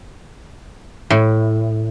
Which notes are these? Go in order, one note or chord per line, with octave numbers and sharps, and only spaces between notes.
A2